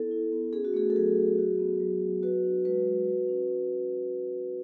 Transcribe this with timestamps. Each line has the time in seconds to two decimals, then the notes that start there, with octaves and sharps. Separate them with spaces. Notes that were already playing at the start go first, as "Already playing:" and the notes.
Already playing: B3 E4 A4
0.11 E4
0.32 B3
0.53 C#4 G#4
0.65 F#4
0.74 A3 G#4
0.90 A4
0.96 F#3 G#4
1.17 F#3
1.38 F#4
1.59 B3
1.80 F#3
2.02 F#3
2.23 F#4 B4
2.44 D4
2.65 G#3 B4
2.87 G#3
3.09 F#4
3.29 C#4